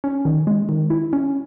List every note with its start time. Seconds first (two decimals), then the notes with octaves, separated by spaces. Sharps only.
0.04 C#4
0.25 D#3
0.47 G#3
0.69 D#3
0.90 E4
1.13 C#4